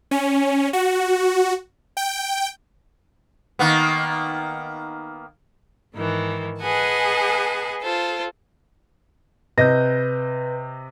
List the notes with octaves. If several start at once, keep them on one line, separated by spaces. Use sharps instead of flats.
C#4
F#4
G5
D#3 A#3 B3
G#2 D#3 E3
G#4 B4 D#5 F#5 G#5 A5
F4 A4 C5
C3 B4 D#5 G6 A#6